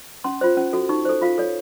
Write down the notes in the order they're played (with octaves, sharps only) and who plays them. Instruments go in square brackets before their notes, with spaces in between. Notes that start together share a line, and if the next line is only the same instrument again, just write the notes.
[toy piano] C#4 C6
F4 C5
C#4
F#4 A4
D#4 C#6
A4 C5
F4 F5
A4 C#5